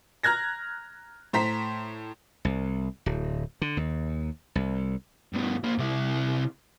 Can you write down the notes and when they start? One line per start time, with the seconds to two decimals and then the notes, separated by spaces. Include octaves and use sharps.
0.23 A#5 F6 F#6 G#6 A#6
1.33 A2 C5 A#5 B6
2.45 C2
3.06 D1
3.62 D3
3.77 D#2
4.55 C2
5.33 G2 B2
5.64 A#3 C5
5.78 C3 E4